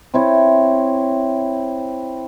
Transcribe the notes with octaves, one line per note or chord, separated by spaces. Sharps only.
C4 E4 C#5